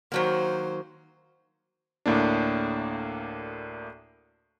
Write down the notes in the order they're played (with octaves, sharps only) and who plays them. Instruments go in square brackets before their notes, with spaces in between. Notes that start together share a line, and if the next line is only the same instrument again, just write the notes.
[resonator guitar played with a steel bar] D#3 F#3 A#3 [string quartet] C5
[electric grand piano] D2 A2 A#3 D4